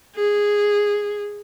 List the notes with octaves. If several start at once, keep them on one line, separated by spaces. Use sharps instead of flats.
G#4